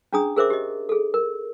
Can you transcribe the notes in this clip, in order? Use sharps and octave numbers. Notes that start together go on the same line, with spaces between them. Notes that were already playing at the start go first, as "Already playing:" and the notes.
C#4 D4 G#4 A#5 D#6
G#4 A#4 C5 E5 D6
G4 D#5
G#4 A4
A#4